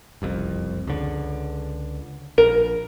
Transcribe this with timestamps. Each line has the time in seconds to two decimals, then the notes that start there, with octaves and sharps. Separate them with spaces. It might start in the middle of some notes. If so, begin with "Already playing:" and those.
0.22 F#1 C2 F2
0.87 C#2 D3
2.38 A#1 A#4